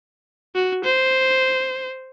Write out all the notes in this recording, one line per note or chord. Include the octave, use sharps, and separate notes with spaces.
F#4
C5